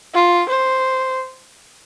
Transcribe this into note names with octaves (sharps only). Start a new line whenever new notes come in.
F4
C5